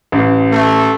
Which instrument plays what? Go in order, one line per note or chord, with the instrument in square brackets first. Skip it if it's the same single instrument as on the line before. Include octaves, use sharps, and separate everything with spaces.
[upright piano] A1
[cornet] A3